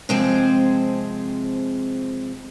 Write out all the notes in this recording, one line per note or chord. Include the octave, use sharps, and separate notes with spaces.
C3 F3 G#3 C4 G#4 C5